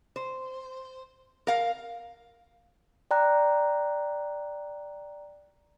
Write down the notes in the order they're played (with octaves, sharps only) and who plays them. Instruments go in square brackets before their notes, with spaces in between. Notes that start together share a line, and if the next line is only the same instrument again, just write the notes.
[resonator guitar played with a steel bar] C5
A#4 F5
[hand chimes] D5 G5 A#5 F#6